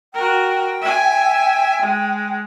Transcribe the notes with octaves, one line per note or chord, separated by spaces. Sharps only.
F#4 A#4 G5
E5 G#5
G#3